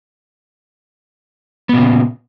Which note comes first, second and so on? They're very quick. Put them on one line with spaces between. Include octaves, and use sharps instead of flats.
B3 A#2 C#3